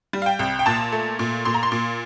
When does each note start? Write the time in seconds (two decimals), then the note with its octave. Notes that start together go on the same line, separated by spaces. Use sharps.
0.13 G3
0.22 F5
0.26 G5
0.39 C2
0.59 G5
0.66 A#2 A5
0.92 A3
1.19 A#2
1.45 A#2 C6
1.54 A#5
1.63 C6
1.72 A#2